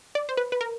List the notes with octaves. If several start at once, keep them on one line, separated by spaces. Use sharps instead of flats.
D5
C5
B4
B4
A#4